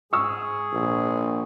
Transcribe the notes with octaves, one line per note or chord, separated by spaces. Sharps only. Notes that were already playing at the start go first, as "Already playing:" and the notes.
G#2 G#4 C#6 E6
A#1 A#2